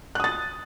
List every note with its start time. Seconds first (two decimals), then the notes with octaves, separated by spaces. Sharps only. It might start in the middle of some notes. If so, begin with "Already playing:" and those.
0.15 F#6
0.20 D#6
0.24 A6